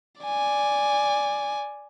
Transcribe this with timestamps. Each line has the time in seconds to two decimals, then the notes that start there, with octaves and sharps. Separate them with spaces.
0.22 D5 G#5